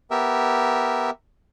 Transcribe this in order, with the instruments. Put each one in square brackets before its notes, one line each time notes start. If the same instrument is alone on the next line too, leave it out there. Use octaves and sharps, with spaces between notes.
[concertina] B3 G4 A#4 E5